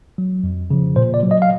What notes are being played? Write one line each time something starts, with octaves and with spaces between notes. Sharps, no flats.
F#3
F2
C#3 F3
A#2 C5
D5
F#3
D#5
F5